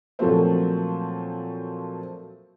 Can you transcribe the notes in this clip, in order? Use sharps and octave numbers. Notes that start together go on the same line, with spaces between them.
A#2 F3 F#3 A3 C4